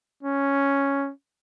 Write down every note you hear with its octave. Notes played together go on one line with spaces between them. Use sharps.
C#4